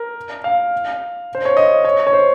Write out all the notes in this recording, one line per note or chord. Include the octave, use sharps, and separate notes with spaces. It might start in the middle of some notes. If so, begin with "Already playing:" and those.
Already playing: A#4
F5
C5
C#5
D#5
C#5
C#5
C5